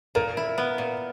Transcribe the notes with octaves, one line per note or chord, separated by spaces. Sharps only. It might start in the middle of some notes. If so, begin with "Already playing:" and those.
A#2 A#4
E4
B3
A#2